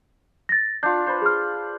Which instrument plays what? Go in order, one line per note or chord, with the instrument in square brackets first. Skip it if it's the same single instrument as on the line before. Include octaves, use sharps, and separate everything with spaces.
[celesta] A6 A#6
[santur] D4 F4 [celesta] G6
[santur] B4 C5
[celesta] G#4 F6